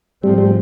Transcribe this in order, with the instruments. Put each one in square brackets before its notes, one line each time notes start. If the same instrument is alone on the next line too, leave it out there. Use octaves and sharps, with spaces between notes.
[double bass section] G#2 F3 A3 C4 [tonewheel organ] G3
[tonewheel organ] G3